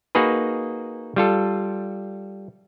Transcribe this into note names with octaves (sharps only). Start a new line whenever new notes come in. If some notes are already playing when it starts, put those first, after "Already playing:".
A#3 D#4 F#4 G#4 B4
G3 F4 A4